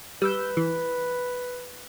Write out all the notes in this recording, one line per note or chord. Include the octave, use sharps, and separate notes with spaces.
G3 B4 E6 G6
E3